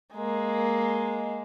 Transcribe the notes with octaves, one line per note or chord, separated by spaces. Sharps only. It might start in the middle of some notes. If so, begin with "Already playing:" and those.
G#3 A#3